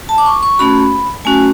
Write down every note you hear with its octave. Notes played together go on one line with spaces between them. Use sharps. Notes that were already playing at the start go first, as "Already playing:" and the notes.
A5
D6
C#6
C#6
A3 C#4 F#4 B5
A3 C#4 F#4 G#5